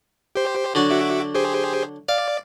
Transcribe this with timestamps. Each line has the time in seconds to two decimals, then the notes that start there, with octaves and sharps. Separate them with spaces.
0.35 G4 C5
0.75 D3 F#3 D4
0.90 F#4 E5 D6
1.35 G4 G#4 C5
2.09 D5 F5